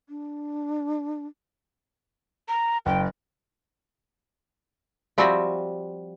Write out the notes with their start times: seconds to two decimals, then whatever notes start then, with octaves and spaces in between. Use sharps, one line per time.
0.09 D4
2.49 A#5
2.86 F#1 G5
5.18 F3 G3 C4 F#4 E5 G#5